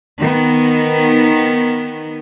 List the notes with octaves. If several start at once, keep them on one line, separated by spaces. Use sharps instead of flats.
D#3 B3